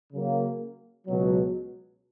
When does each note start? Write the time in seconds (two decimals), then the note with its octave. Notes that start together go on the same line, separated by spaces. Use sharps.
0.13 C#3 F#3 A#3
1.07 C#2 B2 F#3